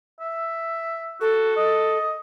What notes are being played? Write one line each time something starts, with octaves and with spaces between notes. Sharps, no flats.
E5
F#4 A4
D#5